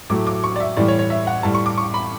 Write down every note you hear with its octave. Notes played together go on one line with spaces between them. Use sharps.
A2 F#3 A3 D6
D6
C#6
D5
E5
A2 E3 G3 D5
C#5
C#5
E5
F#5
A2 G3 A5
C#6
D6
C#6
B5